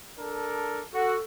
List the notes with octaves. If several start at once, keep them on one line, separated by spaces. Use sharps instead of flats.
D4 A4 A#4
F#4 A4